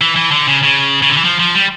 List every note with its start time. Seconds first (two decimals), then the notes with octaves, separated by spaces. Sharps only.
0.01 E3
0.16 E3
0.31 D3
0.47 C#3
0.63 C#3
1.02 C#3
1.09 D3
1.17 E3
1.25 F3
1.40 F3
1.55 G3